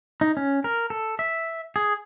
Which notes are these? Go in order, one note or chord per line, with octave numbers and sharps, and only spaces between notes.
D#4
C#4
A#4
A4
E5
G#4